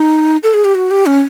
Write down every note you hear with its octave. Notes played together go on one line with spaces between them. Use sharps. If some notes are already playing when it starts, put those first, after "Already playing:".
Already playing: D#4
A4
G#4
G4
F#4
G4
C#4